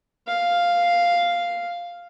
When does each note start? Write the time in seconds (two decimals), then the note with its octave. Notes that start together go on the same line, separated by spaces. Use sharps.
0.28 F5